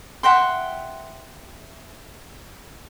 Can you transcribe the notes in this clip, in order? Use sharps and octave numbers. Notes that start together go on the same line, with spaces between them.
E5 F#5 G5 C6